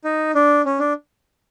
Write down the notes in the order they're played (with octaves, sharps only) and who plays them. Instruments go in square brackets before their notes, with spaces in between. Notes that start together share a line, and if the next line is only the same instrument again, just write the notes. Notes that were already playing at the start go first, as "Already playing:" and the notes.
[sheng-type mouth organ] D#4
D4
C#4
D4